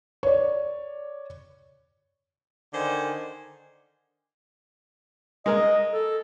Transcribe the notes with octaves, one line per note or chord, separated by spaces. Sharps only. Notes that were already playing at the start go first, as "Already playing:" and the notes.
C#5 D5
D3 D#3 C5 G#5
G#3 A#3 A#4 D#5
A4